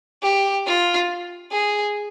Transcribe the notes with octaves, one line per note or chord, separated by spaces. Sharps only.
G4
F4
G#4